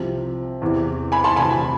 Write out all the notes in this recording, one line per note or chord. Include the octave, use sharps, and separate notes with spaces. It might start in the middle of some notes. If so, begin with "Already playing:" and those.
Already playing: C2 C3 F3
E2 C3 E3
G#5 B5
A5 C6
D2 C3 E3 G#5 B5